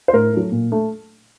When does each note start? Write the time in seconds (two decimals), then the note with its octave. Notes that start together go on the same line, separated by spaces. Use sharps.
0.08 C5
0.13 A2 A#4
0.33 F#3 A3
0.52 A#2
0.72 A3